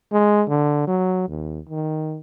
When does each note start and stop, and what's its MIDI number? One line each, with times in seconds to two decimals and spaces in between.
0.12 0.43 56
0.49 0.86 50
0.87 1.27 54
1.29 1.60 39
1.69 2.19 51